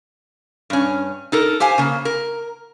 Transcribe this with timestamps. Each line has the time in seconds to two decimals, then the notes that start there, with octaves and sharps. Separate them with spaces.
0.70 G2 C#4
1.32 D#4 A4 A#4
1.60 G4 C5 F5 G#5
1.78 C#3 A#3
2.05 A#4